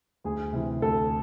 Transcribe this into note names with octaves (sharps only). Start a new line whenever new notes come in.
D2 G#4
C3 E3
D2 A4